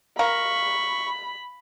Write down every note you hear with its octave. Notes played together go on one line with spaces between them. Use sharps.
A#4 F5 B5 C#6